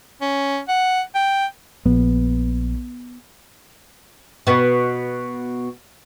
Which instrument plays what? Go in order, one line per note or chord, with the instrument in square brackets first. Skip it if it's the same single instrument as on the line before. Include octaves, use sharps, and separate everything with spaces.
[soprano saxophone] C#4
F#5
G5
[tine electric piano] A#1 [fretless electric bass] B3
[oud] B2 B3